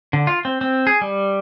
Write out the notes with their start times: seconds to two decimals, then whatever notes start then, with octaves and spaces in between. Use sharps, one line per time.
0.13 D3
0.27 F4
0.45 C4
0.61 C4
0.87 G#4
1.01 G3